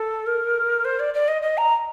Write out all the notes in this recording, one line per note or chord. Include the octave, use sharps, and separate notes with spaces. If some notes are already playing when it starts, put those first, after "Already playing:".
Already playing: A4
A#4
C5
D5
D5
D#5
D#5
A#5